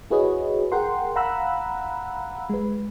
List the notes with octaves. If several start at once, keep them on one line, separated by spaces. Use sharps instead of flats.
E4 F#4 G#4 B4 C#5 D#5
G#4 A#4 F#5 G5 C6
F5 F#5 A#5 B5 E6 F#6
G#3 B4